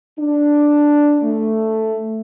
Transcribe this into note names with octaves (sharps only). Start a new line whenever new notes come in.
D4
A3